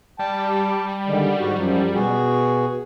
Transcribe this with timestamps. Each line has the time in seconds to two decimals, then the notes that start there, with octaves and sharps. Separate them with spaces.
0.19 G3 G5 A5
1.08 D3 D#3 G#3
1.39 G#2 F#4
1.56 F#2 F3 F#3
1.94 B2 F#4 G#4